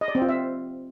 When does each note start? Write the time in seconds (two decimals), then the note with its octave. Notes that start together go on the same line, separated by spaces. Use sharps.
0.01 D#5
0.08 D5
0.15 C4
0.22 F4
0.29 E5